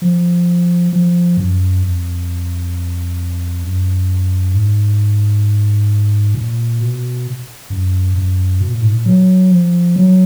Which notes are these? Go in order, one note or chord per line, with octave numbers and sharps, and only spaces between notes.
F3
F3
F#2
F2
F#2
G#2
A#2
B2
F#2
F#2
B2
A#2
G#2
A#2
F#3
F3
F#3